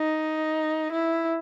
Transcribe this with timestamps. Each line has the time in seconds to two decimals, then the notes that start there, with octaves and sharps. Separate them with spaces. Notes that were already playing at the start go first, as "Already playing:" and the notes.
Already playing: D#4
0.92 E4